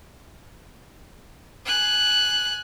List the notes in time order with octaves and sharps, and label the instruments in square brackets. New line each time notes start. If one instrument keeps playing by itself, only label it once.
[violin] G#5 F#6